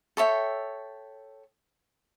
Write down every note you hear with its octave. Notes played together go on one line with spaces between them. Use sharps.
A4 C#5 E5 G5